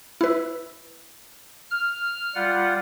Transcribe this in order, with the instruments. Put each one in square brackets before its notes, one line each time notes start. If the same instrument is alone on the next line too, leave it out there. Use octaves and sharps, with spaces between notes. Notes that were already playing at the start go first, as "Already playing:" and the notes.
[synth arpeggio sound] E4 B4
[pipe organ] F6
G3 F4 F#5